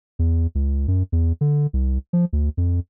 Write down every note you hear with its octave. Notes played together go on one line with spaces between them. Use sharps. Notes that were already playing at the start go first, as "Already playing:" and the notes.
E2
C#2
F#2
E2
D3
C2
F3
D2
F2